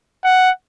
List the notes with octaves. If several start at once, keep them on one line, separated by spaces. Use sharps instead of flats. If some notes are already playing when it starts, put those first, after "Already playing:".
F#5